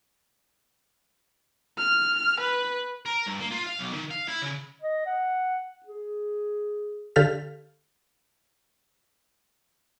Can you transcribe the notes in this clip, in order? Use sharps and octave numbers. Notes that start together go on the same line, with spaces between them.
F6
B4
A#4
G2
A#3
F4
F5
B1
D#3
F5
E4
C#3
D#5
F#5
G#4
D3 G4 A4 F5 F6 B6